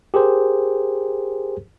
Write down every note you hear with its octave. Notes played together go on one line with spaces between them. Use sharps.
G4 G#4 A#4 C5